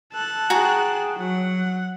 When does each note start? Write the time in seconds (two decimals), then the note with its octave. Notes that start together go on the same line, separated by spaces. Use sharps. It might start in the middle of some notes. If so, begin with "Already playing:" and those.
0.13 A4 A5 F#6
0.50 F#4 G#4 G5 G#5 A#5
1.19 F#3 F#5